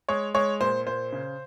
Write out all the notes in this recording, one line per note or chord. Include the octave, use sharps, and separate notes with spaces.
G#3 C#5
G#3 C#5
A#2 C5
A#2 C5
C#3